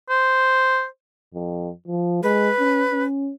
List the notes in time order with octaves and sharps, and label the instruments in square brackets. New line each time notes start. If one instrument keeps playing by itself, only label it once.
[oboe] C5
[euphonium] F2
F3
[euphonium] G#3 [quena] B4
[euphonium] C#4
C#4